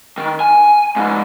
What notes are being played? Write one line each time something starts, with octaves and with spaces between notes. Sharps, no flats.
D#3
G#5
C#2 G#2